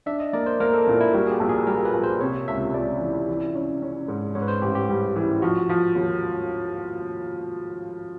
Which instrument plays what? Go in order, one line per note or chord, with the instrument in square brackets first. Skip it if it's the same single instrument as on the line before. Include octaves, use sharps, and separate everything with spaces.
[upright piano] D4 [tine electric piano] E5
[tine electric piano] D#5
[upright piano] A#3 [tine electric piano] D5
[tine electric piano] C5
[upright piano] A#3 [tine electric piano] A#4
[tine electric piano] A4
[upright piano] A#2 [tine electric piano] E4
[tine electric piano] E4
[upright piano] G3 [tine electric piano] F#4
[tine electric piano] G#4
G4
[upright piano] A#1
[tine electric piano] G#4
[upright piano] G3 [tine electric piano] A#4
[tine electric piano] B4
[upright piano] A#1
[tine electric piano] C5
[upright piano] C3 [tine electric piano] C#5
[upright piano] C#2 [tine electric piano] E5
[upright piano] C#2 [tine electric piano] D5
[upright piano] E3
E3
C#4
C#4
G#2
[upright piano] G#2 [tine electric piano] C#5
[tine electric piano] B4
C5
[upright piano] A1 [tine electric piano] G4
[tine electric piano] G4
[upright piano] G3
E3
[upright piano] F3 [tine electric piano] F#4
[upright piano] F3
D#2